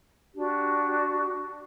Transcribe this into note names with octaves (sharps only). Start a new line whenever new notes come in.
D4 F#4 G4